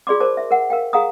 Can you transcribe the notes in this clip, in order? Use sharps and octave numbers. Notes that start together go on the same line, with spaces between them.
F4 G#4 D5 C6 D6
A#4 C5 A5 D6
E5
A#4 F#5
A#4 F5 G5
G#4 F5 F#5 A#5 D#6